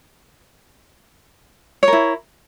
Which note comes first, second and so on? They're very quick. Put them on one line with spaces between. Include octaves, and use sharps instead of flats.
C#5 A#4 E4